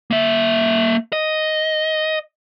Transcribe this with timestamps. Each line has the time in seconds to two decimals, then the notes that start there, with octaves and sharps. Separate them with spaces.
0.11 A#3 E5
1.13 D#5